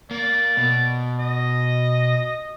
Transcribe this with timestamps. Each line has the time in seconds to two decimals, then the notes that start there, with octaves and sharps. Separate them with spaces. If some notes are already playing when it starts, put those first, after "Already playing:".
0.11 A#3 D5
0.57 B2
1.19 D#5